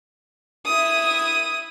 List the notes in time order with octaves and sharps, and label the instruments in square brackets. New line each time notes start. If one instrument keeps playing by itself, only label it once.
[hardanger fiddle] E4 D#6